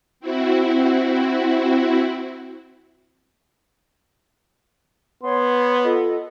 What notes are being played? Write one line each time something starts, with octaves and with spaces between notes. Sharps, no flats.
C4 E4 F#4
B3 C#5 C6
F4 A4 D#5